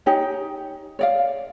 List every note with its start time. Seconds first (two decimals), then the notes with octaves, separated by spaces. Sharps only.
0.06 D#4 G4 C#5 G#5
0.99 C#5 D5 F5